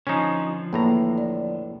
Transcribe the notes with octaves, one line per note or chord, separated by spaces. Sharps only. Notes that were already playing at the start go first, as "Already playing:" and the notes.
D3 F3 C#4 D#4
E2 A2 A#3 A#5
D5